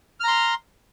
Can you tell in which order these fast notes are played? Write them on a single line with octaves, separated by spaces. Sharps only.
F6 A#5 C6